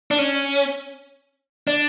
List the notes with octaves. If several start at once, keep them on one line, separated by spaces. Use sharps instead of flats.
D4
C#4
D4